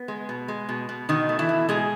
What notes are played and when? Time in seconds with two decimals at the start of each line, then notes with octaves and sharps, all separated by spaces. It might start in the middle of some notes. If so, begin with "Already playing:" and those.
Already playing: B3 B4
0.08 G#3
0.29 B2
0.48 G#3
0.69 B2
0.89 B2
1.09 B2 D#3 D#4
1.29 A3
1.39 E3 E4
1.49 B2
1.69 B2 G#3 G#4